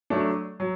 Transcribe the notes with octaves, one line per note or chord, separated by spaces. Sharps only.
F#3 A3 D4
F#3